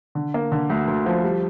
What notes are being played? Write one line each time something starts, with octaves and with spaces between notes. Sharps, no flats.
D3
A#3
D3
D2
D2
F3
G3